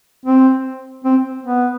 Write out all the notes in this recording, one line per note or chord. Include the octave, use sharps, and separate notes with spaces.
C4
C4
B3